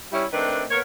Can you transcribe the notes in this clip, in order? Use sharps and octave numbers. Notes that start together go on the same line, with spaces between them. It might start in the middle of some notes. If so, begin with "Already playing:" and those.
G3 C#4 E4
D#3 A3 C4 D4 B4
A#3 B3 A#4 C#5